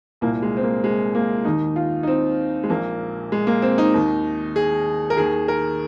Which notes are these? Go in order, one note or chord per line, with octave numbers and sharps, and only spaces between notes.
C2 A#2 A#3
G#3
C4
A#3
G#3
A#3
D#2 D#3 D#4
F4
D#4
C4
G#3
A#1 A#2 A#3
G#3
A#3
C4
D#4
D#2 D#3
G#4
A#4
D#2 D#3 G#4
A#4